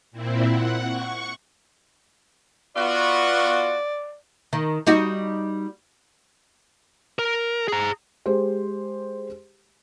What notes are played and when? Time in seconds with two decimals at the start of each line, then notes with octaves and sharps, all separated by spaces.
0.11 A#2 C4 E4
0.47 F#5
0.84 C#6
2.76 B3 F4 F#4 D5
4.53 D#3
4.87 G3 D#4 F#4
7.19 A#4
7.68 G#4 A#5
8.26 G#3 G4 C5